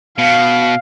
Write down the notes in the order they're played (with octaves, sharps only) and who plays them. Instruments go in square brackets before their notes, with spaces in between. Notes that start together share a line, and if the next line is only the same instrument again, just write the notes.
[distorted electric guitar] B2 [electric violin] F5